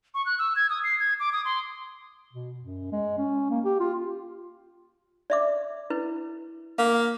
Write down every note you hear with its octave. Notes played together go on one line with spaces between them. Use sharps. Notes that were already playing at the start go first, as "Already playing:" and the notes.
C#6
F#6
E6
G#6
D#6
C7
G#6
D6
D#6
C6
B2
F#2
G#3
C#4
A#3
G4
F4
D5 E5 D6
E4 B4
A#3 F5